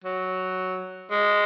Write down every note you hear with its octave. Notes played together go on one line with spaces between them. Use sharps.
F#3
G#3